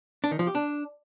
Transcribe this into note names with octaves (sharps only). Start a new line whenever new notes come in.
D4
D#3
F3
G4
D4